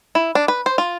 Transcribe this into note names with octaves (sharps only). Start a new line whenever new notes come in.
E4
D4
B4
C5
F4